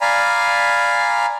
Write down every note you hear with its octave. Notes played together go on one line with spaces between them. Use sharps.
D5 F5 G#5 A#5 B5